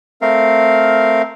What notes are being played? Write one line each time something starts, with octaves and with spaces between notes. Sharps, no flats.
A3 C4 A#4 F5